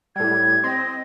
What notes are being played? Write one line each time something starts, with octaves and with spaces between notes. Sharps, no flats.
A2 G3 G#6
C4 D#5